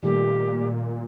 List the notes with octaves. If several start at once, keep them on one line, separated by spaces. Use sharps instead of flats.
A#2 D#3 G3 A3 G4